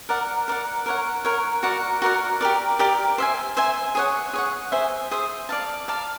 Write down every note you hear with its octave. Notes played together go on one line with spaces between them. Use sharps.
A#4 D5 F#5
A#4 D5 F#5
A#4 C#5 F#5
A#4 C#5 F#5
F#4 A#4 D5 F#5
F#4 A#4 D5 F#5
G4 A#4 D5
G4 A#4 D5
C5 E5 G#5
C5 E5 G#5
G#4 C#5 F#5
G#4 C#5 F#5
G#4 C5 E5
G#4 C5 E5
D5 F5 A5
D5 F5 A5